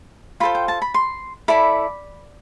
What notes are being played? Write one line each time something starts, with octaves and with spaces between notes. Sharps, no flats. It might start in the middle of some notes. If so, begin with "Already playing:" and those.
F4 A4 C5 B5
G5
A5
B5
C6
E4 A4 D5 B5